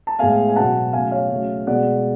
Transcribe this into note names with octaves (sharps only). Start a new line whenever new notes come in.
A5
A2 G#3 B3 F5 G#5
G#5
B2 F#3 B3 F#5 A5
C#3 F#3 A3 F5 G#5
C#5 F5
C#3 F#3 A3
B2 G#3 B3 D5 F#5